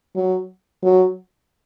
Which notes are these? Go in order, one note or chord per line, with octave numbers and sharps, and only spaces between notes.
F#3
F#3